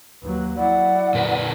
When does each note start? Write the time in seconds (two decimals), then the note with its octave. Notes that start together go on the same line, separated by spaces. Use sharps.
0.23 D#2 F#3 B4
0.57 F#3 E4 D5 F#5
1.15 A#2 A#4 B4